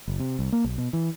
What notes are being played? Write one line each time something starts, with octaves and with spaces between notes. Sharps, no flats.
F#1
C3
C2
A#3
B1
B2
E3